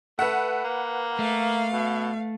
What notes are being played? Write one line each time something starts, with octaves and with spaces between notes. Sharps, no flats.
A3 B4 F#5
A#3
A3 F5
B2